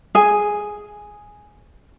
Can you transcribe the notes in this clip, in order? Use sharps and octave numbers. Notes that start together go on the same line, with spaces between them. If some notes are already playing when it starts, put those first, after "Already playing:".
G#4 G#5